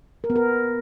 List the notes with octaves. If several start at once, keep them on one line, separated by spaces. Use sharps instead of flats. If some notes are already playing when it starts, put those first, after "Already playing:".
A#4
B3
A#4